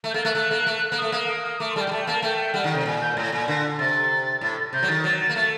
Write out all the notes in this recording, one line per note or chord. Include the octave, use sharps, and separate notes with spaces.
A3
G6
A#3 A6
A3 F#6
A3
A#3
A3
A#3
A3 D#6
A#3 D#6
D#6
D#6
A3 D6
C6
G3 A5
G5
G3
A3 A5
G5
A#3 A5
A3 G5
G5
G3 F#5
D#3
G5
C3
A#2
G6
A2 A#6
A#2
D3 A#6
C3 A6
A2
C3 G6
F#3
D#3 A6
F#3 A6
A6
A#3
A3 A6